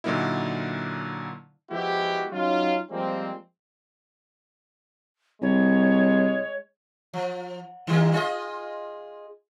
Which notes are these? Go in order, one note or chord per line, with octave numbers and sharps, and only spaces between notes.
A#2 D3 F#3 A#3 D#4 E4
F3 G#3 B3 E4 F#4 G4
F#3 C#4 D#4 F4
F3 G3 G#3 A#3 C4
C2 G#3 C#5
F3
D#3 G3 A#3
F4 G#4 D#5